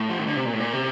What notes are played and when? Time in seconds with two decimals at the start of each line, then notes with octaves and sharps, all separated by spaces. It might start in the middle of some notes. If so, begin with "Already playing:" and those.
Already playing: A2
0.09 F3
0.19 D#3
0.27 D3
0.36 C3
0.46 A#2
0.53 A2
0.60 A#2
0.73 C3